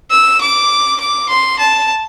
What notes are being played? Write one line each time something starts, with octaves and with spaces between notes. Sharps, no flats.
E6
D6
D6
C6
A5